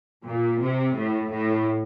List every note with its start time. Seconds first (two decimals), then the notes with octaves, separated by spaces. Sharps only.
0.24 A#2
0.60 C3
0.95 A2
1.31 A2